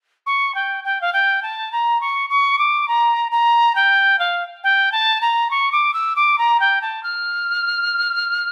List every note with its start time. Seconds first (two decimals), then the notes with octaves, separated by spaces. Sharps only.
0.26 C#6
0.54 G5
0.84 G5
1.01 F5
1.13 G5
1.42 A5
1.72 A#5
2.01 C#6
2.30 C#6
2.58 D6
2.88 A#5
3.31 A#5
3.75 G5
4.19 F5
4.63 G5
4.92 A5
5.21 A#5
5.50 C#6
5.72 D6
5.93 E6
6.15 D6
6.38 A#5
6.59 G5
6.81 A5
7.03 F6